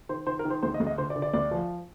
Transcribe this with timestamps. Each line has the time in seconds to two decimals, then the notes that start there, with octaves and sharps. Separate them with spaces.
0.09 D#3 C5
0.26 D#3 C5
0.39 A#4
0.45 D#3
0.50 C5
0.62 D2 C5
0.74 D#5
0.80 D2
0.87 D#5
0.98 D3 C5
1.10 D5
1.16 D3
1.22 D5
1.34 D2 D5
1.51 F3